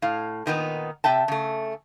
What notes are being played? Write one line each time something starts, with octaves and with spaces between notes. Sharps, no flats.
A2 F5
A#2 D#3 B3 D#4
C3 E5 G5 A5
C#3 A3